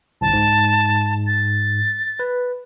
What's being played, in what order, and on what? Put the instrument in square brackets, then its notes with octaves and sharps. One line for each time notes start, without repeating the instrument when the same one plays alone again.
[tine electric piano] G1 C2 [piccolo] A5
[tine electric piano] G#2
[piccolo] A6
[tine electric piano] B4